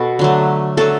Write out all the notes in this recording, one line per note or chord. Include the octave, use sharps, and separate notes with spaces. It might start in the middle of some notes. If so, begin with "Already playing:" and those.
Already playing: B2 A4
D3 F#3 A3
D3 F#3 A3 A4